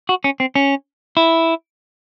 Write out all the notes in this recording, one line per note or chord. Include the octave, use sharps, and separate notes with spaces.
F#4
C#4
C4
C#4
E4